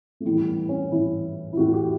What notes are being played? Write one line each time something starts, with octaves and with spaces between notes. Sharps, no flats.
A3
A2 E3 G3
B3
C#4
A2 E3 E4
E4
A2 E3 F#4
G4